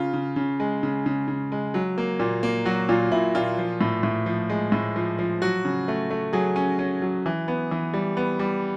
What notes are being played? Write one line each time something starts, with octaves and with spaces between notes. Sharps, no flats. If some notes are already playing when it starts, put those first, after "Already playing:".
Already playing: C#3 F4
C#3
C#3
G#3
C#3
C#3
C#3
G#3
F#3
A#3
A#2
A#3
F#3 F#4
A#2 F4
A#2 E4
A#2 F4
F3
A2
A2
F3
G#3
A2
F3
F3
F#3 F#4
C#3
A3
A3
F#3 G#4
C#4
C#4
F#3
E3
B3
E3
G3
B3
G3